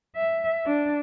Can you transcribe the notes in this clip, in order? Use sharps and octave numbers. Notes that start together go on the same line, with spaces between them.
E5
D4